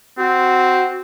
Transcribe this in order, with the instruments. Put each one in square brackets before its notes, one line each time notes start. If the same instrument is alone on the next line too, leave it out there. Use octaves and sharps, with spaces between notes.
[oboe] C4 [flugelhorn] F#4